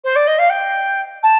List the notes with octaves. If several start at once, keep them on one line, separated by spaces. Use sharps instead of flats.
C5
D5
D#5
F5
G5
A5